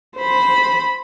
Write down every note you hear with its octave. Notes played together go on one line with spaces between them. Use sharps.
C5 B5